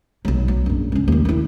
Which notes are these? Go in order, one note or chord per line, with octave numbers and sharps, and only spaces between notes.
B1 F#3
F#3
A#1 F#2
C#2 C#4
D#2 D#3
D#3 E4